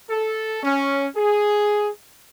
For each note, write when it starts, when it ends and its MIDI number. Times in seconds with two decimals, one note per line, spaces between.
0.10 0.62 69
0.63 1.07 61
1.16 1.90 68